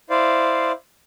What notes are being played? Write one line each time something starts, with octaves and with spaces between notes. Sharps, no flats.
E4 C5 D5 F5